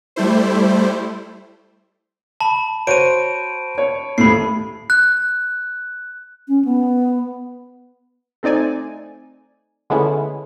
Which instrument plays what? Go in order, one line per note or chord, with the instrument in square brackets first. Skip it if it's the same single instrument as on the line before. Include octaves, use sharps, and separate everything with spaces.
[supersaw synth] G3 A3 E4 C5
[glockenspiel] A5 B5
[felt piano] F#4 C5 C#5 [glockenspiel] D7 D#7
[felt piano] C#5
[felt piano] D#1 A2 [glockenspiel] B5 C7
[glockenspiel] F#6
[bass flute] C#4
B3
[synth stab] A3 C4 D#4 D5 G#5
D3 G#3 A3 B3 C#4 E4